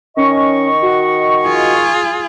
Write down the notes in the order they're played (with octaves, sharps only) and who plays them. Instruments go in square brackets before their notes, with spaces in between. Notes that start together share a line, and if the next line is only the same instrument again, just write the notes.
[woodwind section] D#3 D#5 C#6 [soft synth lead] C#4
[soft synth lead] F#4
[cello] F4 G#4